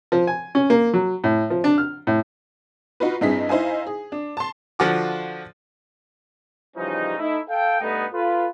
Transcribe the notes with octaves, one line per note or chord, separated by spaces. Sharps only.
F3
G#5
C#4
A#3
F#3
A2
F3
D4
F6
A2
D#4 F4 F#4 B4
G2 C4 D#4 E4 G#4 B6
D#4 E4 C5 F5 G#5
G#4
D4
A5 C6
D3 F3 F4 F#4 D6
C#3 E3 F3 G3 C#4 D#4
A3 D#4 E4
A4 F5 G5
G2 A3 B3 D#4
F4 A4 B4